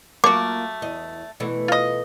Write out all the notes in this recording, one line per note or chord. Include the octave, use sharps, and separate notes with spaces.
A3 A#3 F4 F#4 A#4 D6
E2 D#5
B2 E3 A3
F4 D#5